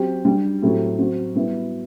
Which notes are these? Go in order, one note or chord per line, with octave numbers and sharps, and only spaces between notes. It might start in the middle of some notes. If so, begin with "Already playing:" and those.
Already playing: F#3 C4 G4
G3 D4 G4
A2 F#3 A3 C4 G4
F#3 C4 F#4
G3 B3 E4